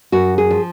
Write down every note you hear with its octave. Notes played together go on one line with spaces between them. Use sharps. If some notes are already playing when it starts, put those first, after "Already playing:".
F#2 F#4
G#4
F3